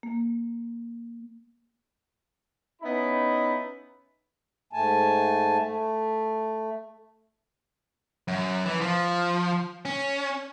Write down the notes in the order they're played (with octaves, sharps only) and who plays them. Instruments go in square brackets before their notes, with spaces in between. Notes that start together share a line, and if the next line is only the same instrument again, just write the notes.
[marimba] A#3
[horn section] B3 C#4 D#4 E4 B5
[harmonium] G#2 A3 G#5 A5
A3
[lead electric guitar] F#2
E3
F3
C#4